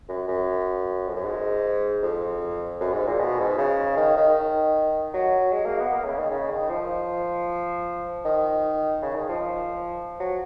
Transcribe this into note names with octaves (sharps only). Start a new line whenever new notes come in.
F#2
F#2
F2
F#2
G#2
F2
F#2
G#2
A#2
B2
G#2
C#3
D#3
D#3
F#3
G#3
A#3
B3
A#3
C#3
D#3
C#3
D#3
F3
D#3
C#3
D#3
F3
F#3